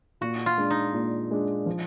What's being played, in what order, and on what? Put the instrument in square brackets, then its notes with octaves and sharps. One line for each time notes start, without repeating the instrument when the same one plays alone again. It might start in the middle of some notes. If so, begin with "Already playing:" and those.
[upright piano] A#2 [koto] F#4
[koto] F4
[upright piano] G#3 D4
[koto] D#4
[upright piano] A#2
G#3 D4
F3